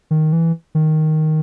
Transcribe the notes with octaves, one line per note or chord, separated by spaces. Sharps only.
D#3
E3
D#3